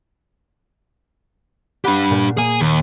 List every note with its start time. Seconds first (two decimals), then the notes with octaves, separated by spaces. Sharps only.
1.85 D4 G4 F#5 B5 B6
2.10 A#2
2.37 A#3 G#4 G#5
2.61 D#2